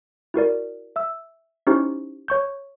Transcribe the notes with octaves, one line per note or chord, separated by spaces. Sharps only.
E4 F#4 A#4 D5
E5 E6
C#4 D#4 E4 G4 C5 C#6
C#5 C#6 G6